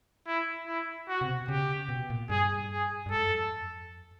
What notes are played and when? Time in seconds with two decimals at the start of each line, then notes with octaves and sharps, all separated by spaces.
0.27 E4
0.67 E4
1.08 F#4
1.21 C3
1.28 B2
1.48 C#3 G4
1.89 B2
2.10 A#2
2.29 G2 G#4
2.71 G#4
3.06 G2
3.11 G#2 A4
3.22 F#2
3.31 F2